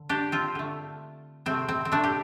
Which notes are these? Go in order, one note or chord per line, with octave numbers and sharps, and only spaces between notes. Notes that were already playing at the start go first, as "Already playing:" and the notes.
Already playing: D3
D4 G4
C4 F4
D3 A3
C3 A3 C4
C4
C4
A3 D4
G4